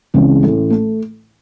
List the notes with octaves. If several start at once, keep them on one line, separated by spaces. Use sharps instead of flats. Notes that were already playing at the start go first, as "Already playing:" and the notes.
C#2 C#3 E3 G#3 C4
A1 A2 E3
A3